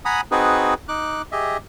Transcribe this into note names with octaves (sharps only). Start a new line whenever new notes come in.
F#5 G#5 A#5 B5 D#6
C4 D#4 F#4 G#4 B4
D#4 D6 F#6
G4 G#4 D#5 E5